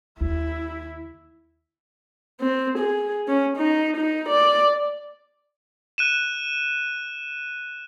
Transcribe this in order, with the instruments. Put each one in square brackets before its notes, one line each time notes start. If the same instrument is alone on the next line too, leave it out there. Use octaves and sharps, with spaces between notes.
[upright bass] D#2 [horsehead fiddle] E4
[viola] C4
G#4
C#4
D#4
D#4
D5
[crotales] F#6 D#7 E7